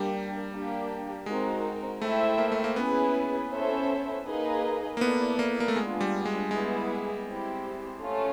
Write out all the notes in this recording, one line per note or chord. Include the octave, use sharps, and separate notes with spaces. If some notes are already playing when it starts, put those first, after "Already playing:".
Already playing: G3 A#3 D4 G4
A#3 D4 G4
G#3 C4 D#4 F#4 A#4
A3 E4 A4 C5 E5 G5
A#3
A3
A#3
B3 C#4 E4 G#4 B4
C#4 E4 A4 C5 E5
A#3 D#4 G#4 B4 D#5
A#3
B3 E4 A4 D5
A#3
A#3
A3
G#3 B3 D4 F4 G#4
G3
G#3
G#3 B3 E4 G#4
C4 E4 G4
A3 C#4 F4 A4